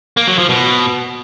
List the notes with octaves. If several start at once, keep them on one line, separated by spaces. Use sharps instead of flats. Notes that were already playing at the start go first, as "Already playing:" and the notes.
A#3
F#3
F3
B2